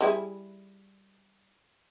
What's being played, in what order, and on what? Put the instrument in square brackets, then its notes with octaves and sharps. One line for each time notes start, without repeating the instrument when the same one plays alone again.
[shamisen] G3 E4 G#4